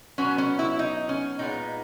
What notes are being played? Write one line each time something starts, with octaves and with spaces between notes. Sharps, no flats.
B2 F#3 B3 C#4
C#4
E4
D#4
C#4
A#2 G#3 B3 D#4